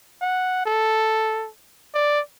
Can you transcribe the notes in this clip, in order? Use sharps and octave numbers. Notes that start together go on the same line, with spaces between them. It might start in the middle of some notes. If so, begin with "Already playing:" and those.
F#5
A4
D5